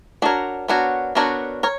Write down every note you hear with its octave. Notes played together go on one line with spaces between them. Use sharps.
B3 D4 F#4 A#4 C#5
B3 D4 F#4 A#4 C#5
B3 D4 F#4 A#4 C#5
A#4 C#5